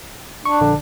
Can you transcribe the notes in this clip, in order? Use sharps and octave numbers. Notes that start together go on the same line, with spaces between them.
D4 C#6
A#1 D3